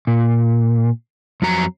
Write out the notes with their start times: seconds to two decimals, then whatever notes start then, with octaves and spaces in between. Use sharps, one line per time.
0.07 A#2
1.42 F2 F#3 A#5